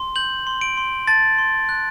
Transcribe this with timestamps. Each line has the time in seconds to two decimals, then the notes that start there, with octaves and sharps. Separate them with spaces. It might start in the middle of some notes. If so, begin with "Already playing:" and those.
Already playing: C6
0.16 G6 F#7
0.47 C6
0.61 D7
0.77 C6
1.07 A5 A6
1.38 C6
1.69 F#6